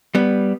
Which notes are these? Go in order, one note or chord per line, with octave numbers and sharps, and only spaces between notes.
G3 B3